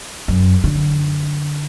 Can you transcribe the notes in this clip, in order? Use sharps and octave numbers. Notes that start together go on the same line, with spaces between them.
F#2
D3